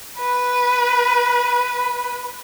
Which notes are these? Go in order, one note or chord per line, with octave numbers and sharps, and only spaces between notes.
B4